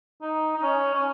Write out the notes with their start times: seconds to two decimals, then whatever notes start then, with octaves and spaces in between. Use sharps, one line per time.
0.22 D#4
0.56 D#4
0.63 C#4
0.94 C#4